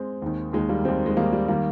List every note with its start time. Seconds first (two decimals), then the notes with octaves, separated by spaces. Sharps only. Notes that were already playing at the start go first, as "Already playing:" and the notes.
Already playing: G#3 C4
0.22 D#2 D#3
0.53 D#2 D#3 G#3
0.69 G3 A#3
0.85 D#2 D#3 G#3 C4
1.06 G#3
1.17 D#2 D#3 G3 A#3
1.33 G3
1.48 D#3 G3 A#3